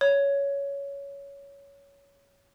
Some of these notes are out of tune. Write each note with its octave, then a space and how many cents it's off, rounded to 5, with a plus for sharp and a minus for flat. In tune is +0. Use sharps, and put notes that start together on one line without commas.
C#5 +15